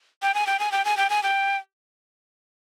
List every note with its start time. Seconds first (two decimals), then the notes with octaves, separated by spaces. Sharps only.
0.22 G5
0.34 G#5
0.47 G5
0.59 G#5
0.72 G5
0.85 G#5
0.97 G5
1.10 G#5
1.23 G5